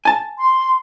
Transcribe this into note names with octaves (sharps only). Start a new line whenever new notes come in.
G#5 A5
C6